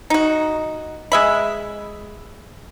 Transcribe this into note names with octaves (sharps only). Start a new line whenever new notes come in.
D#4 F#4
G#3 E5 B5